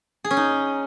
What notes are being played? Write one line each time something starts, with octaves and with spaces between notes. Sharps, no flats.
G#4
C#4
D#4